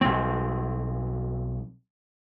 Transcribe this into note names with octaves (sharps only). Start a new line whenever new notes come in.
B1 C4